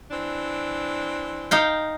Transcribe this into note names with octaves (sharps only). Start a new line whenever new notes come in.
E3 C4 D4
D#4 F5 G5